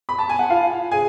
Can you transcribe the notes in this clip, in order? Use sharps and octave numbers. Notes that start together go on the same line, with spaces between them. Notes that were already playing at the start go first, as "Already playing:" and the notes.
B5
A5
G#5
F#5
F4 F5
G#4 G#5